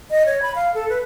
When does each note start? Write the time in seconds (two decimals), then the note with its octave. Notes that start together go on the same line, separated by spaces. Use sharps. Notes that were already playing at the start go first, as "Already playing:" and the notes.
0.11 D#5
0.26 C#5
0.42 B5
0.55 F5
0.74 A4
0.89 B4